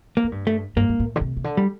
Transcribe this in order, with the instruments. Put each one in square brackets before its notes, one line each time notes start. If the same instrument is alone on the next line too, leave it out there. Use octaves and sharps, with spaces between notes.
[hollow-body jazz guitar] A#3
[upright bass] A2
G2
[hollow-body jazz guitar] A3
[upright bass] G2 [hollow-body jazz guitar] A#3
[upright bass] G2
A2
D3
C3
C3
D3
[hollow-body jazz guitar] G3